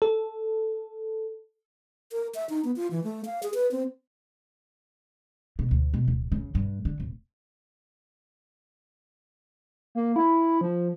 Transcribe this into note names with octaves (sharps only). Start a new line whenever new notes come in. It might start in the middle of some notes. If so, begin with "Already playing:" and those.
A4
A#4
E5
D#4
B3
F4
E3
A3
F5
G#4
B4
C4
B2
D2
B2
D1
C#3
G2
D3
D1
A#3
E4
F3